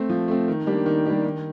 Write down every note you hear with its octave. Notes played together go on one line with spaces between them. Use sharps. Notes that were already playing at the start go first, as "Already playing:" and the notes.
Already playing: A3 C4
F3
A3 C4
D#3
G3 A#3 D4 G4
D#3
G3 A#3 D4 G4
D#3